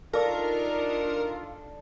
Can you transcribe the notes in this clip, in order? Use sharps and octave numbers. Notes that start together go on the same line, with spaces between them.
D4 D#4 F4 A4 A#4 D5